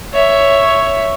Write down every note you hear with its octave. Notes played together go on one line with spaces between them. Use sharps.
C#5 E5